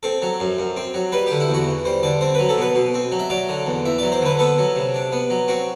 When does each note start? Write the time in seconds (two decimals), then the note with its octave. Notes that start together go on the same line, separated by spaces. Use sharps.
0.03 C4 A4
0.22 F#3
0.40 F#2
0.59 F#2
0.76 C4
0.94 F#3
1.12 G3 B4
1.27 D3 G4
1.40 E4
1.49 E2
1.54 F#4
1.67 E2
1.85 G3 C5
2.03 D3 D5
2.21 C4 C5
2.34 B4
2.39 F#3
2.49 A4
2.58 B2 B4
2.75 B2
2.94 C4
3.12 F#3
3.19 E5
3.30 F#3 D5
3.49 D3
3.66 E2
3.85 E2 E5
3.98 F#3 D5
4.12 C5
4.21 D3 B4
4.39 B3 A4
4.58 F#3
4.75 C3
4.94 D4
5.12 B3
5.30 F#3
5.48 C4 F#4